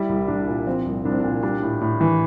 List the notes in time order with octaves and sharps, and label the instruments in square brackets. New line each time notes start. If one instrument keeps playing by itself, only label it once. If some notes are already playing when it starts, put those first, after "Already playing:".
Already playing: [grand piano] G3 E4
C2
C2 D4
A#2
F3 C4
C2
C2 D4
C4
A#2 D4
G3 D4
A2
A2
E3